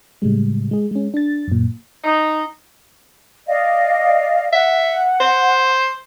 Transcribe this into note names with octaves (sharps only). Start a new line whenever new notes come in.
A2 C#3 G3 G#3
G#3 G#4
G#3 C#4
D4 A6
F#2 A#2
D#4
D5 D#5 F5
E5 F#5
C5